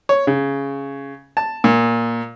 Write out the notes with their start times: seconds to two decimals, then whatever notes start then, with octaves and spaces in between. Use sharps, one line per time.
0.09 C#5
0.27 C#3
1.37 A5
1.64 A#2